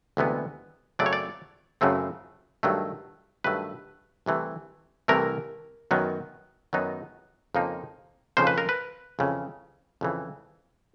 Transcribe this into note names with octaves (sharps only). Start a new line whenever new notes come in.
D2 C3 E3 G#3 B3
F#2 C#3 F#3 A3 C4 D5
C#5
D5
F#2 C#3 F#3 A3 C4
G2 D#3 F#3 A3
G2 D#3 F#3 A3 B4
C2 C3 E3 A3
C2 C3 E3 A3 A#4
F#2 D#3 F#3 B3 D#4
F#2 D#3 F#3 B3 D#4
F2 C#3 F3 A#3 D#4
F2 C#3 F3 A#3 D#4 C5
B4
A#4
B4
F2 C#3 E3
F2 C#3 E3